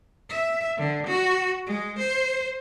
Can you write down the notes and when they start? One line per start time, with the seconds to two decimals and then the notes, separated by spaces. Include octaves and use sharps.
0.30 E5
0.78 D3
1.07 F#4
1.66 G#3
1.98 C5